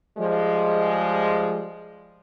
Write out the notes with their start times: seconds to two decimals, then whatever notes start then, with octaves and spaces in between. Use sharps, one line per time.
0.18 F3 G3 G#3